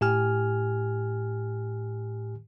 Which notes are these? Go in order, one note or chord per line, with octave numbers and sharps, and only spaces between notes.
A2 G4 G#5 F6